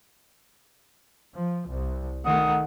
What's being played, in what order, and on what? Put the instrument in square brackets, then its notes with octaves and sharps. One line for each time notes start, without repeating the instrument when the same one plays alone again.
[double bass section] F3
C2
[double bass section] D#3 A3 [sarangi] F#5 [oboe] D#6